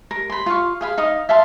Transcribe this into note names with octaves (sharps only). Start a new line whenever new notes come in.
A#4
B5 C6
F4 F5 C#6
G#4 F5 B5
D#4 F5 D#6
E5 F5 A5 C6